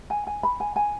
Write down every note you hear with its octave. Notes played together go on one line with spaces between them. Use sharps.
G#5
G#5
B5
G#5
G#5